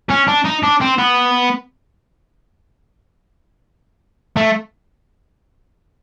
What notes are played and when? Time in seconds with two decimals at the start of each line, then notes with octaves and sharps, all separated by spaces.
0.09 C#4
0.27 D4
0.44 D#4
0.63 D4
0.81 C4
0.98 B3
4.37 A3